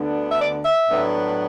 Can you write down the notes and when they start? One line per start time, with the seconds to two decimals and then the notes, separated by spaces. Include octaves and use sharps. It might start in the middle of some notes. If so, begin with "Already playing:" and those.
Already playing: D2 D3 B3 D4
0.31 E5
0.40 D5
0.64 E5
0.88 A2 F#3 B3 D4